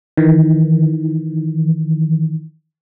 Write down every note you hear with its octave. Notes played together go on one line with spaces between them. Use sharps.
D#3 E3